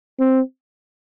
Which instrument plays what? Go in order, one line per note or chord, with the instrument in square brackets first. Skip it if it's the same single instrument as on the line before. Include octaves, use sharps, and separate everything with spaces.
[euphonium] C4